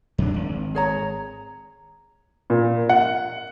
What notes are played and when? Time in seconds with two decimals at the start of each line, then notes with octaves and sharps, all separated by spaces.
0.18 F2 F#3 D4
0.34 G#1
0.75 G#4 C#5 A#5
2.50 A#2
2.89 F#5